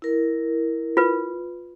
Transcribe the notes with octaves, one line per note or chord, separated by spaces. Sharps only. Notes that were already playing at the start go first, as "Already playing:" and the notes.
E4 A#4
F4 B4